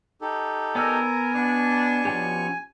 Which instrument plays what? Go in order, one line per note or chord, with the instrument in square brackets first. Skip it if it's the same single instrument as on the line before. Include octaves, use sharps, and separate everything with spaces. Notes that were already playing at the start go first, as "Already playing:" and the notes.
[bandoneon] D#4 G4 A4
[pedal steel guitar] B3 D5 E6 [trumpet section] A#4 [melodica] G#5
[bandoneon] B2 C#6 [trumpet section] D4
[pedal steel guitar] F3 C#4 G4